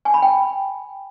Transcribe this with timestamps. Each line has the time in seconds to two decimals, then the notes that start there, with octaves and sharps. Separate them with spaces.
0.05 G#5
0.14 B5
0.22 G5